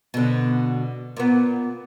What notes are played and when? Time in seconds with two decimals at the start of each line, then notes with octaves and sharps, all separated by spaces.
0.14 B2 D3
1.17 A#2 B3